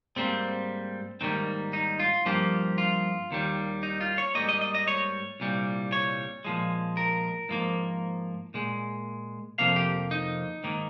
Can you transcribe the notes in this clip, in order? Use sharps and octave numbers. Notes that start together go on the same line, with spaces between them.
G#2 G3 A#3 C4
G#2 D#3 G3 A#3 C4
D#4
F4
G2 F3 A#3 G4
F4
D#2 D#3 G3
D#4
F4
C#5
G#2 G3 A#3 D#5
D#5
D#5
D#5
C#5
C2 A#2 G3
C#5
A#2 F3 G#3
A#4
G#2 F3 A#3
A#2 G#3
F2 C3 F3 A#3 F5
G4
D#4
G#2 D#3 A#3